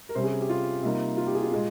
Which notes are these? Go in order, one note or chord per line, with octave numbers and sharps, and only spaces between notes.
A#4
C3 G3 C#4 C5
G#4
G4
F4
C3 G3 A#3 D#4
F4
G4
G#4
F4
A#2 G#3